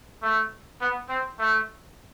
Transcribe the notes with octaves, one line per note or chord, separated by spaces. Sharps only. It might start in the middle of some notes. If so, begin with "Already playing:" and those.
A3
B3
C4
A3